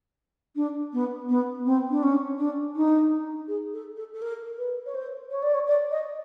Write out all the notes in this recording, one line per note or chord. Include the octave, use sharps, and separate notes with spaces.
D4
B3
B3
C4
D4
C#4
D4
D#4
G#4
A4
A4
A4
A#4
B4
C#5
C5
C#5
D5
C#5
D5
D#5